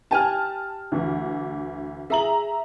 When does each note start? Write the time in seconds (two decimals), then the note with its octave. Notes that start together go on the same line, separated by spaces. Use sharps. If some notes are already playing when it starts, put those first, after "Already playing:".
0.11 G4 G#5 A5 F6
0.92 D2 E3
2.10 G#4 E5 A#5 F#7